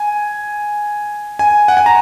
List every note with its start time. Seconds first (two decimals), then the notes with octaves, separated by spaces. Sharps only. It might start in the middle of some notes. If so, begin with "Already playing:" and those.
Already playing: G#5
1.39 G#5
1.68 F#5
1.77 G#5
1.86 A#5